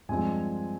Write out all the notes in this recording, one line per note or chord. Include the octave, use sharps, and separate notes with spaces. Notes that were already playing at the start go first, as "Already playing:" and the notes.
G2 F3 G#3 C4 G#5